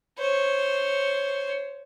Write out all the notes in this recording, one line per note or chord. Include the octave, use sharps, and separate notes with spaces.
C5 C#5